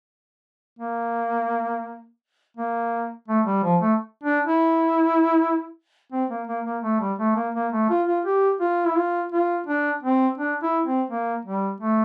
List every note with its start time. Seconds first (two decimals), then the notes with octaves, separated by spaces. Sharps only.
0.79 A#3
2.57 A#3
3.28 A3
3.46 G3
3.63 F3
3.82 A3
4.23 D4
4.47 E4
6.12 C4
6.30 A#3
6.48 A#3
6.65 A#3
6.83 A3
7.01 G3
7.19 A3
7.36 A#3
7.55 A#3
7.73 A3
7.90 F4
8.08 F4
8.25 G4
8.61 F4
8.87 E4
8.97 F4
9.32 F4
9.67 D4
10.03 C4
10.38 D4
10.63 E4
10.86 C4
11.10 A#3
11.45 G3
11.81 A3